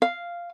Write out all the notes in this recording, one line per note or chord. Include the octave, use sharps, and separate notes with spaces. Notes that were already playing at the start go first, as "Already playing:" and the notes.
F5